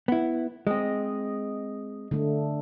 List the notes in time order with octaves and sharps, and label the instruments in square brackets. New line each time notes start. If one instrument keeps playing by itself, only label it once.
[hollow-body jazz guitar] B3 E4
[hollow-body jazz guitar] G#3 C4 [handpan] D#5
[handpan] D3 A3